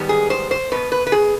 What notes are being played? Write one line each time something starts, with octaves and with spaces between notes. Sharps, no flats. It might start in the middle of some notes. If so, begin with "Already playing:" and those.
Already playing: G#2 D#3 G3 B3
G#4
C5
C5
B2 B3 B4
B4
B4
G#4